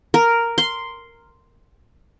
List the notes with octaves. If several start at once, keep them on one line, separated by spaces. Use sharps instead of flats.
A#4
C6